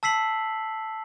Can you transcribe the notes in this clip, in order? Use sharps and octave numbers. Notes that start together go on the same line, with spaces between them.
A5 E6 B6 C7 F#7